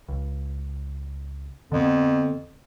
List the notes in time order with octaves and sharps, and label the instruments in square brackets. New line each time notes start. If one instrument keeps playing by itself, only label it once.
[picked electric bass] C#2
[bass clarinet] F2 [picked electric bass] D3 B3